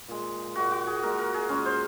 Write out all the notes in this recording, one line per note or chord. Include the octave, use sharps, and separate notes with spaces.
A#2 G#3
A#2 G#3 F#4
F#4
G#4
A#2 G#3 A#4
A#4
G#4
A#2 G#3 C#4
C5